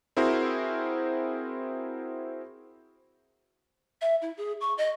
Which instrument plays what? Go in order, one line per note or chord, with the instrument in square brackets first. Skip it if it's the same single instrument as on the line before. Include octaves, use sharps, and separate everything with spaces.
[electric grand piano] C4 E4 F#4 G#4 A#4 C5
[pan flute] E5
E4
G#4
C#6
D#5